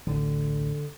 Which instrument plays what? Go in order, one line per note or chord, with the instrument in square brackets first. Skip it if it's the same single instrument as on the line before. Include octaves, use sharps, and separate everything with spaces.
[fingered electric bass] A1 D2 [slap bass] D3